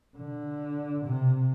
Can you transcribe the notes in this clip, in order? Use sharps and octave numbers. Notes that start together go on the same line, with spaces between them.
D3
C3